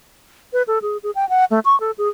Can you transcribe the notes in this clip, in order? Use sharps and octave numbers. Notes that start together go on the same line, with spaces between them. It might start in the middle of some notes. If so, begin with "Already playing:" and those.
B4
A4
G#4
G#4
G5
F#5
A3
C#6
A4
G#4